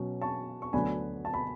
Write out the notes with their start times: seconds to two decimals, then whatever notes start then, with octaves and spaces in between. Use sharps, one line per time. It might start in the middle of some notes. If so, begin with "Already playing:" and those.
Already playing: B2 F#3 C#4
0.21 A5 C#6
0.62 C#6
0.73 D2 D3 F#3 B3 D4 G#5 B5
1.25 A5
1.34 B5